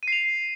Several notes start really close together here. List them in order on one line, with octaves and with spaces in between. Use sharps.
D#7 C7 F7